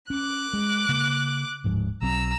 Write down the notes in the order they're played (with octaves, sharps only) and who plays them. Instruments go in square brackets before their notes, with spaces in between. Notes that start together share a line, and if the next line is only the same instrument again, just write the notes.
[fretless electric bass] C#4 [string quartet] D6 F#6
[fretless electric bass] G#3
C#3 A#3
D1 G#2 F3
[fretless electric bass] B1 F#3 C4 [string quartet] A#5 E6